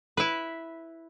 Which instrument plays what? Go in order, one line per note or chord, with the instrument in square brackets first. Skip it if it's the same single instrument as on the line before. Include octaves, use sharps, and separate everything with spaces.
[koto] E4 B4